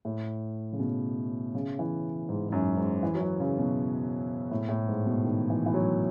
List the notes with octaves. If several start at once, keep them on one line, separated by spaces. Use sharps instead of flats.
A2
C#3
B2
C#3
E3
G#2
G#2
F#2
G#2
E3
F#3
E3
C#3
B2
A2
A2
G#2
B2
D#3
E3
E3
F#3